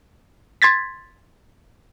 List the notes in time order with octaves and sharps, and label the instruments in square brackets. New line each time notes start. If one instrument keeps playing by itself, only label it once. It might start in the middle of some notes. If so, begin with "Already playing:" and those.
[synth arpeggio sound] C6 G#6 A6 B6